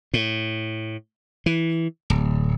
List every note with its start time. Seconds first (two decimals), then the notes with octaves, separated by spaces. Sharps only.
0.14 A2
1.46 E3
2.10 D1